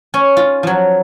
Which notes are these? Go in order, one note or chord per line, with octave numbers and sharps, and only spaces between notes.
C#4
F4
F3 F#3